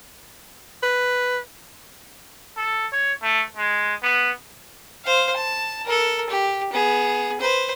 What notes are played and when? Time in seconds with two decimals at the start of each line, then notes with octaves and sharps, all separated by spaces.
0.83 B4
2.57 A4
2.92 C#5
3.23 A3
3.57 G#3
4.03 B3
5.05 C5 F5
5.36 A5
5.85 A4 A#4
6.29 G4
6.72 B3 G#4
7.41 B4 C5